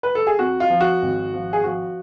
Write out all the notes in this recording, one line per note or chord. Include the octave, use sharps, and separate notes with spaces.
B4
A4
G#4
F2 F#4
F4
F3
F#4
G#1
F3
G#4
F3 F#4